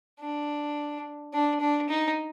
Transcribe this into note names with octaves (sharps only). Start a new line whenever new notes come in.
D4
D4
D4
D#4